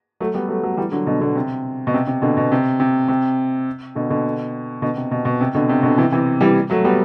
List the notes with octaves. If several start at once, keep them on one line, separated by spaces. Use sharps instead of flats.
F#3 A3
G3 B3
F#3 A3
F#3 A3
E3 G3
D3 F#3
B2 D3
B2 D3
C3
B2
C3
C3
B2 D3
B2
C3
C3
C3
B2 D3
B2 D3
B2 D3
C3
B2
B2
C3
B2 D3
C3
B2 D3
C3 E3
C3 E3
E3 G3
F#3 A3
G3 B3